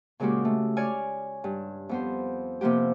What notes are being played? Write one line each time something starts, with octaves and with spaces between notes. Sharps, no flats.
A#2 C#3 G#3 A#3 F#4 G4
A3
C#5 D5 G#5 F6
G2
F2 B3 C5
C3 F3 A#3 B3 G4